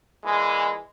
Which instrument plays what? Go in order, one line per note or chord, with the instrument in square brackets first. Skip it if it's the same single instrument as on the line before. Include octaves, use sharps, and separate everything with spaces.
[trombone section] A#2 E3 G#3